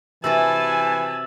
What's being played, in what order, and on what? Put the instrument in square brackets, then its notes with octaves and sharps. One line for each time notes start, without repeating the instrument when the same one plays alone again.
[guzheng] C3 F#4 B4 [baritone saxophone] E3 [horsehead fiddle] G#5 A5 [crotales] E6 A6